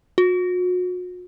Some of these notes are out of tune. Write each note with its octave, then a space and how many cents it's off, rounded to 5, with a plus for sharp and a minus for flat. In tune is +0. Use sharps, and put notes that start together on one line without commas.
F#4 -40